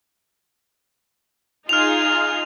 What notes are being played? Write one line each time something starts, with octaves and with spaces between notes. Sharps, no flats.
D#4 F4 G#4 F6 F7